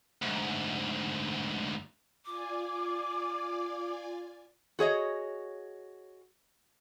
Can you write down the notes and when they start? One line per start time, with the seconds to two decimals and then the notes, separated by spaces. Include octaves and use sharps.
0.22 D2 G#2
2.26 F4 D5 G#5 D6
4.79 F#4 G#4 C#5 D#5